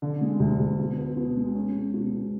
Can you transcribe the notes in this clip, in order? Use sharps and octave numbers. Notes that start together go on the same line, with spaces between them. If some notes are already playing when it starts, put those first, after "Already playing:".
D3
G#3
D2
D2
B2
B3
B2
G#3
C#4
G#3
B2
G#3